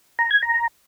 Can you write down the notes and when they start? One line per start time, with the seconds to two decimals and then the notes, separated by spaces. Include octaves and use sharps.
0.19 A#5
0.31 G#6
0.43 A#5